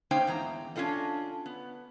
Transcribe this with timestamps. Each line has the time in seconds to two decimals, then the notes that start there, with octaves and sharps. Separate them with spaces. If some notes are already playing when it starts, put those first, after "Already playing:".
0.11 A#3 C#4 D#4 C5 F5 G5
0.27 E2 G#2 A#5
0.76 C#4 D4 F4 A4 D#5
1.46 B3